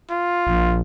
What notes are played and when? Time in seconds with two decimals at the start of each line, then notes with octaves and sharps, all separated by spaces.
0.10 F4
0.47 A#1